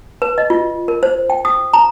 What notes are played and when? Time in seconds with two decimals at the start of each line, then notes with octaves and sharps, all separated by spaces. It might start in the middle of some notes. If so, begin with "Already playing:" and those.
0.22 B4
0.38 D#5
0.50 F4
0.88 A#4
1.03 C5
1.30 G5
1.45 D#6
1.73 A#5